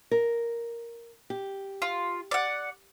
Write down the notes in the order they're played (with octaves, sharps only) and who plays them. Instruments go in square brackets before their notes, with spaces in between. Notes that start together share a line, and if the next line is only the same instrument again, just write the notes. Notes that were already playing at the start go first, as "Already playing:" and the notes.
[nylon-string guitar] A#4
G4
[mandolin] F4
D5 F#5